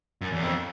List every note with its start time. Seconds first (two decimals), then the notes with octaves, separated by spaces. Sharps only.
0.21 F#2
0.33 E2
0.42 F2